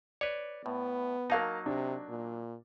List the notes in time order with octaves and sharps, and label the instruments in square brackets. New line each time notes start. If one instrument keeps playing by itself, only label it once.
[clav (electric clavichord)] B4 C#5 [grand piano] D5
[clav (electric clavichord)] A2 [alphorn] B3
[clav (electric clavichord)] F#3 A#3 D#4 [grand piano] A#4 F5 A5
[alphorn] C3 [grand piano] D4
[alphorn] A#2